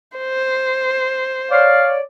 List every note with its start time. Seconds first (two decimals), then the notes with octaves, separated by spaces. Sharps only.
0.18 C5
1.51 C#5 D5 F5